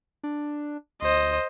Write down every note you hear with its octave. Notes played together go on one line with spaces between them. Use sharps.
D4
D2 C5 D#5